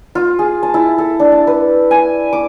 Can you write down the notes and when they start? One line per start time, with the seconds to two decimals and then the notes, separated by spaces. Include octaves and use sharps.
0.15 F4
0.39 G#4
0.63 A5
0.74 E4
0.98 A4
1.20 D4
1.32 A5
1.47 B4
1.91 G#5
2.33 D6